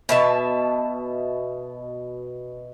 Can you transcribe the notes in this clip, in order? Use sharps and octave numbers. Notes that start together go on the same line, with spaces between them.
B2 E5 A5